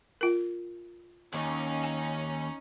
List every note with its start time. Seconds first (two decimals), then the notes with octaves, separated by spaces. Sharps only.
0.21 F4 A#4
1.34 D#2 C#4 D#4
1.84 G#5